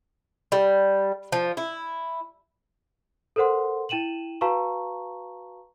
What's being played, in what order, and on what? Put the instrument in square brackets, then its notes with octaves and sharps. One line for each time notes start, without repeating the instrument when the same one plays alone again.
[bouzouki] G3
F3
E4
[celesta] A4 A#4 C5 F#5 C6
E4 G5 D#7 E7 F#7
F#4 B4 F5 A5 A#5 C#6